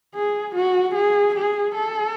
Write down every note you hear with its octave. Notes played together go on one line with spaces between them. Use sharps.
G#4
F#4
G#4
G#4
A4